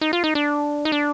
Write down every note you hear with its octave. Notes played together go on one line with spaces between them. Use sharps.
D#4
F4
D#4
D4
D#4
D4